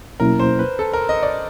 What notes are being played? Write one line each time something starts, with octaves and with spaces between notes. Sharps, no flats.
B2 F#3 A#3 C#4 E4 A#4
C5
B4
A4
A#4
D#5
D5